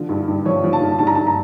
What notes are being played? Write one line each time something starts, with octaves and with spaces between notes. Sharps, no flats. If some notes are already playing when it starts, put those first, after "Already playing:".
Already playing: D3 F3
G2
G2
F3 C#5
F3
A5
G2
G2 A5
A#5
G2 A5
A#5